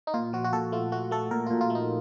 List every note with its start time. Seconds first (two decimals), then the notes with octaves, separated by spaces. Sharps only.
0.07 D#4
0.14 A#2 F4
0.33 F3 F#4
0.44 F#4
0.53 A#2 A4
0.72 A3 F4
0.92 A3 F#4
1.11 A3 A4
1.31 A#2 A#4
1.46 A#2 F4
1.61 F4
1.70 A3
1.75 D#4